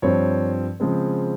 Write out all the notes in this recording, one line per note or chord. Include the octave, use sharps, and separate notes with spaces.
G2 F3 C4 C#5
C#3 F3 G#3 C4